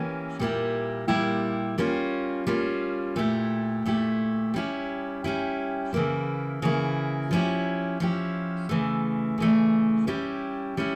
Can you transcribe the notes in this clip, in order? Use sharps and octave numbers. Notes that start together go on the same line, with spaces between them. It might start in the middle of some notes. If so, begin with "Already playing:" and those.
Already playing: E3 A#3 C#4 G4
A#2 G3 A#3 E4 G4
A#2 G3 A#3 E4 G4
G3 A#3 C#4 F4
G3 A#3 C#4 F4
A#2 A3 E4 G4
A#2 A3 E4 G4
G3 C#4 E4 G4
G3 C#4 E4 G4
C#3 E3 A#3 E4
C#3 E3 A#3 E4
F3 C#4 E4 G4
F3 C#4 E4 G4
C#3 E3 A3
C#3 E3 A3
G3 C#4 E4 G4
G3 C#4 E4